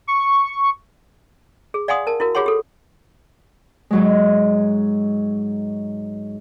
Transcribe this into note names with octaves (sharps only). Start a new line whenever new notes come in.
C#6
G#4
D5 F5 F#5 G#5 C6 D#6
A#4 A5
E4 F#4 A#4
F4 G4 G#4 C#5 F#5 C6
G4 A4
G#2 F#3 G#3